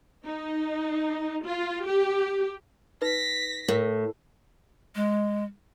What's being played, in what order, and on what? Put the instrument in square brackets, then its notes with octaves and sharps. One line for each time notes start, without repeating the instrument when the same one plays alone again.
[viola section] D#4
F4
G4
[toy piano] D#4 B4 [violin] A#6 B6
[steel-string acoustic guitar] A2 [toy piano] A#4
[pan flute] G#3